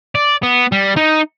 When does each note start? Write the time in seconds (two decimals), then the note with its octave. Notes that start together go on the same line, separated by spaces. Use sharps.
0.15 D5
0.43 B3
0.72 G3
0.97 D#4